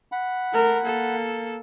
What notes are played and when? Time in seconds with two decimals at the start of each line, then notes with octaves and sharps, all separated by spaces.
0.12 F#5 B5
0.53 A3 A#4
0.83 A#3 A4